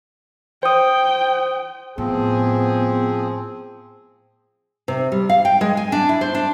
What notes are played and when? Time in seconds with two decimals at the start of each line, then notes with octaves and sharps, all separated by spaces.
0.63 C5 G5 D#6
1.98 A2 F3 B3 C4 G#4
4.88 C3
5.12 G3
5.29 F5
5.45 G5
5.61 G#3
5.77 G#5
5.92 D4
6.09 E4
6.21 C5
6.35 D4